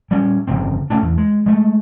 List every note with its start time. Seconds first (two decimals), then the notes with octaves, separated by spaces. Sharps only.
0.11 G3 C#4
0.47 G1 F2 C#3 C4
0.90 D2 A3 C#4 D4
1.02 E2
1.17 G#3
1.46 G#3 A3